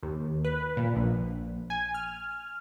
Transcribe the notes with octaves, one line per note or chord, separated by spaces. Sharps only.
D#2
B4
A#2
A#1
G#5
F6